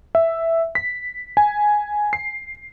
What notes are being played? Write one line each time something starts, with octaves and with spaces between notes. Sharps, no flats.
E5
B6
G#5
C7